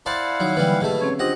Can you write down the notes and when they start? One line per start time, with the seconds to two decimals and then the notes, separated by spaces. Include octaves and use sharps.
0.06 E4 C5 D5 F5 F#5 A5
0.40 D#3 F#3 D#4
0.56 D3 E3 F#3 G3 A#3
0.81 B2 A3 G4 G#4 G5
1.01 C4 C#4 C#5
1.19 C4 D4 F4 G4 D#5 F#5